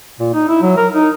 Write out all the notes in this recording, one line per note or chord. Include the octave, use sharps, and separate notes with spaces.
A#2
D#4
E4
F#3
A#4
D#4